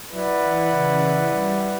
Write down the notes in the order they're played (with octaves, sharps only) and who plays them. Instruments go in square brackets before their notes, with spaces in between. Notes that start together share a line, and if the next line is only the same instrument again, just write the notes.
[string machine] F#3 [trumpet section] E4 B4 D5 F#5
[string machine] E3
C#3
E3
G3